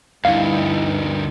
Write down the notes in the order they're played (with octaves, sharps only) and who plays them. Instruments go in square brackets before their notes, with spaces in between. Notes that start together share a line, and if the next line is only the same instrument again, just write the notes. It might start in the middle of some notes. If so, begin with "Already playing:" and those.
[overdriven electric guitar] D2 G2 [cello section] G3 B3 D#4 [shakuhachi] E4 [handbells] F5